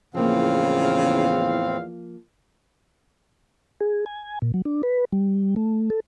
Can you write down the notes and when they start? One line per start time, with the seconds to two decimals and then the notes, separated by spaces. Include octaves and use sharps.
0.14 E2 A2 C#3 F3 A#3 C4 F5
3.80 G#4
4.06 G#5
4.42 A#2
4.54 F#3
4.65 D4
4.83 B4
5.12 G3
5.56 A3
5.90 A4